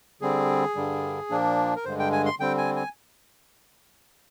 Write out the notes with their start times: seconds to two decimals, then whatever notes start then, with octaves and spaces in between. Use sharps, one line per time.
0.21 D3 G3 C4 G#4
0.75 G2 D3 G3
1.30 A#2 F3 A#3 D4
1.76 A#4
1.85 G2 D3 G#3 C5
1.99 G5
2.12 G#5
2.26 C6
2.39 D3 G3 C4 G5
2.58 G#5
2.76 G#5